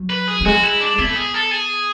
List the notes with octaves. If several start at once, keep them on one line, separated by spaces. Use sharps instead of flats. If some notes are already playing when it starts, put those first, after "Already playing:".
Already playing: F#3
B4
G#4
F#3
G#3 F#4
E4
D4
B3 E4
A4
G#4
A4
G#4